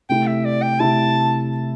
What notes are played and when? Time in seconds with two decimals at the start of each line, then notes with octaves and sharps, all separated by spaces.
0.09 C3 A3 E4 G5
0.27 E5
0.45 D5
0.62 G5
0.80 C3 A3 E4 A5